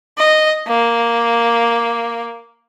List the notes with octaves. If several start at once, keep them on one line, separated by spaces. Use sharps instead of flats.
D#5
A#3